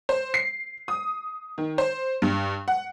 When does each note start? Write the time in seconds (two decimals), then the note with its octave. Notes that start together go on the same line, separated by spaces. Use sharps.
0.09 C5
0.34 C7
0.88 D#6
1.58 D#3
1.78 C5
2.22 G2
2.68 F#5